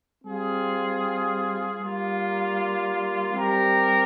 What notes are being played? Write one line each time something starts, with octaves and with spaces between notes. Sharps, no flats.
G3 C4 F4 G#4
G3 A#3 F4
G3 C4 G4 A#4